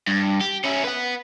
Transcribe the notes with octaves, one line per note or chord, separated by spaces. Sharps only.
G2
G4
C#4 E4
B4 F#5